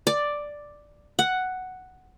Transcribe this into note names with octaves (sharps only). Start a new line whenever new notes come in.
D5
F#5